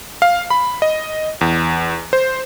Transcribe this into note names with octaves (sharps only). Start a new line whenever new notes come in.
F5
B5
D#5
E2
C5